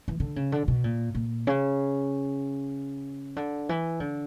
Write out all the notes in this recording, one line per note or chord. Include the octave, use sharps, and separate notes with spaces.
E3
D3
C#3
D3
B2
A#2
A#2
C#3
D3
E3
D3